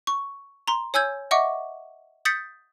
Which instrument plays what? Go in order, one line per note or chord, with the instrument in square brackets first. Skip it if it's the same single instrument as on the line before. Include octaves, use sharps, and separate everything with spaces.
[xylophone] C#6
A#5 C6
C#5 G#5 E6 G6 G#6
D#5 E5 F#5 C#6 D6
D#6 G6 A6 B6 C#7